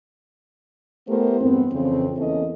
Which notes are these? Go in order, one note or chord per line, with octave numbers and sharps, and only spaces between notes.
A3 B3 E4 G4 A#4 C5
E2 G2 B3 C4
F2 C#3 E3 C4
E2 E3 A#3 C#4 A4 D#5